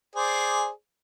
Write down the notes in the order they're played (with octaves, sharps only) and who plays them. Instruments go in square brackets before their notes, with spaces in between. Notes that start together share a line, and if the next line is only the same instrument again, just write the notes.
[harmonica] G#4 C5 D5